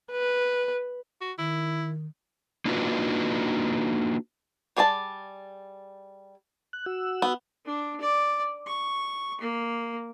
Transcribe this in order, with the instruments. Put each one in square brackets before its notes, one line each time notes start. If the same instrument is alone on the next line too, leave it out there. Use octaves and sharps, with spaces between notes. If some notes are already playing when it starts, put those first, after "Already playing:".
[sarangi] B4
[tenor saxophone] F#4
[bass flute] D#3 [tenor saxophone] E4
[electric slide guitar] A#3 D4 D#4 F4 F#4 B4
[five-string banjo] G3 G#4 D5 E5 A5
[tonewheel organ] F#6
F#4 F#5 E6
[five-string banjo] B3
[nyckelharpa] D4
D5
C#6
A#3